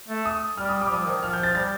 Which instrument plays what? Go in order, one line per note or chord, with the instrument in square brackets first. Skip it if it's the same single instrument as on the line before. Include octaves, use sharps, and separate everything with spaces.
[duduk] A3
[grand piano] D#6
[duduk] G3 [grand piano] F6
[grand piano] D#6
[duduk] G3 [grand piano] D6
[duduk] F3 [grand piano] D#6
[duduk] D#3
[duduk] F3 [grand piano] F6
[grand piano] G6
A6
[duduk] G3 [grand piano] A6